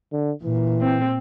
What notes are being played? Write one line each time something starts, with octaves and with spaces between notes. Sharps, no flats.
D3
A#2 E3
C4